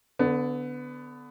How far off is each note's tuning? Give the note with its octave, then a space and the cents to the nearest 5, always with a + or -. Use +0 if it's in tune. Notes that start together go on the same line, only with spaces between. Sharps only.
D3 -10 B3 +20